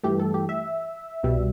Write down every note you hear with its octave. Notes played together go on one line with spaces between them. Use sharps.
G2 E3 A3 G4
A4
G4
E5
C2 B2 G3